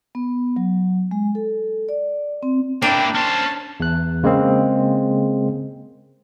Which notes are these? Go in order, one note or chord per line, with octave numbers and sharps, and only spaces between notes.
B3
F#3
G#3
A4
D5
C4
A#3 D4 E4 G5
C#4 C5 A5
E2 F#6
C#3 G#3 A#3 C4